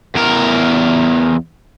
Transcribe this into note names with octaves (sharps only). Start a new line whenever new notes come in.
E2 A#4